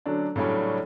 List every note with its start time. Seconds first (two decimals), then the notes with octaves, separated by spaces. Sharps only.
0.06 D3 F#3 A3 C#4 D4
0.36 A2 C#3 F#3 G3 C#4 D4